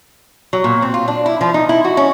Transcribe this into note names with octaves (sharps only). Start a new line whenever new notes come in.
F#3
A#2
C4
F4
D4
E4
F3
D#4
E4
F#4
C#4